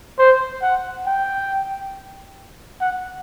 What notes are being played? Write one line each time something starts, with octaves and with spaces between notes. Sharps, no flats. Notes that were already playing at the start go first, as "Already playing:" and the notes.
C5
F#5
G5
F#5